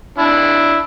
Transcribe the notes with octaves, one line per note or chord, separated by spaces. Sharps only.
D4 E4